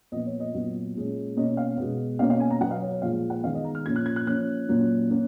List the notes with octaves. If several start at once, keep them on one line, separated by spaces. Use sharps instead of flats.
A#2 F3 B3 D#5
C#5
D#5
A#2 F#3 B3
A#2 G#3 C#4
B2 A#3 C#4 D#5
F5
B2 G#3 B3
B2 A#3 C#4 F5
F5
G#5
A#5
B2 F#3 B3 F#5
F5
C#5
C#5
A#2 F3 G#3 F5
F#5
D#3 G#3 B3 F5
D#5
A#5
F6
A#2 F3 A#3 C#4 G#6
F#6
G#6
F#6
F3 A#3 C#4 F#6
A#2 F#3 A#3 C#4
A#3 C#4